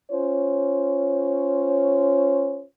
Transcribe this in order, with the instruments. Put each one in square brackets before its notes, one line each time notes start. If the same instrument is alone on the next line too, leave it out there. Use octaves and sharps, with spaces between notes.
[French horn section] C#4 F4 C5 C#5